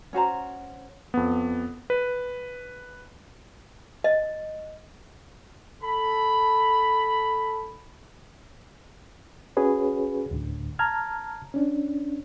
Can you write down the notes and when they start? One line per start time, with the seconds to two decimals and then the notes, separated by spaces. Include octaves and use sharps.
0.13 C#4 F#4 C5 A#5
1.14 F2 B3
1.90 B4
4.04 D#5
5.83 A4 B5
9.57 C#4 F#4 G#4 B4 C#5
10.31 D2 A2 D3
10.79 A5 A#5 F6 G#6
11.54 C#4 D4